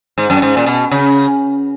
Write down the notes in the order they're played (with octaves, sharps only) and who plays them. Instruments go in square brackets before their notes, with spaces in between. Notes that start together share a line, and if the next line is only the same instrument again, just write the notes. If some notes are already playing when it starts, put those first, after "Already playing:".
[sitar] G#2
F#2
G#2
A#2
B2
C#3